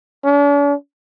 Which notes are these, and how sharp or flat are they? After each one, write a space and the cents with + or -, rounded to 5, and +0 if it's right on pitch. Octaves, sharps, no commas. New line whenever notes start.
D4 -45